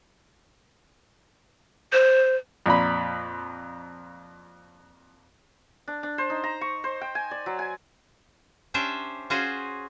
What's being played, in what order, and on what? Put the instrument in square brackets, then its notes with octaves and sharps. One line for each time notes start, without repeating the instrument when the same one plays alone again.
[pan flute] C5
[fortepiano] F2 A#2 B5
[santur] D4
D4
C5
D#4
A#5
C#6
C5
G5
G#5
D5
F#3
G#5
[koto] C#4 D4 G4 C5 E5
C#4 F4 F#4 G#4 C5